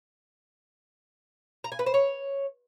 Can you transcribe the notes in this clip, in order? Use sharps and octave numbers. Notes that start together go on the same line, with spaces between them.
A#5
G#5
B4
C5
C#5